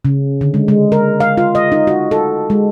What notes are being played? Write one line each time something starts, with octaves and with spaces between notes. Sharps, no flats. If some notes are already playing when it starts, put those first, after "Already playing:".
C#3
D3
G#3
G#3
A#4
F5
F4
D#5
D#4
F#4
A4
G#3